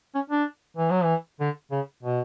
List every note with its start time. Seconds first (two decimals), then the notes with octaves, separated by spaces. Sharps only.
0.15 C#4
0.30 D4
0.77 E3
0.91 F#3
1.04 E3
1.40 D3
1.71 C#3
2.03 B2